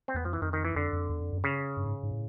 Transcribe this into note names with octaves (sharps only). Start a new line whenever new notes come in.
C4
E2 B3
F2 F3
E3
F2 D#3
D#3
E3
F2 D3
F2
E2
F2
F#2
C#3
G2
G#2
G#2
A2